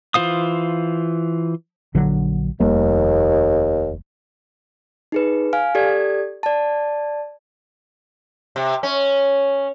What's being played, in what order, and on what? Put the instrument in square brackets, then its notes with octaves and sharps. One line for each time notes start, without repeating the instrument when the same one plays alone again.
[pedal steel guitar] E3 F4 C5 F5 D#6
[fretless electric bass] A#1 D3 F#3
[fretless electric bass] F1 G3 A#3 [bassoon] D#2
[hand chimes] D#4 G#4 B4
F5 G#5 F6
G4 A4 D5 G#6
D5 A5
[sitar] C3
C#4